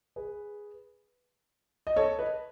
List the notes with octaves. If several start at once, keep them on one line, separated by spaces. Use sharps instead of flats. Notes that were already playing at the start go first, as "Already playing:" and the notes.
G#4 B4
D#5
A4 C#5
B4 D#5